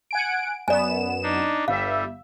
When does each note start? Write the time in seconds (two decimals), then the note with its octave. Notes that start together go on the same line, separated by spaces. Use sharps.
0.11 F#5 G#5 D7
0.68 F#2 B3 D5 G#5 E7
1.23 D4 D#4
1.68 G1 G3 E5 F5